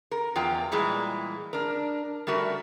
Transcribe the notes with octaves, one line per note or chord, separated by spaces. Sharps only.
A#4
E2 F#3 F4 G5
A#2 E3 G3 G#3
D4 A#4
G3 A3 F#4 A#4